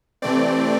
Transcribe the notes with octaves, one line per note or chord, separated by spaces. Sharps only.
C3 E3 A3 C4 D5